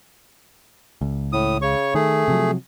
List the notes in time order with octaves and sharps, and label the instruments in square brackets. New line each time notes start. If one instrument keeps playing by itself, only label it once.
[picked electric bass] C#2
[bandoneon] A2 D#6
C#3 C#5 C#6
[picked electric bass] D#3 [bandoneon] A3 G#4
[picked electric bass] C3 F3 F#3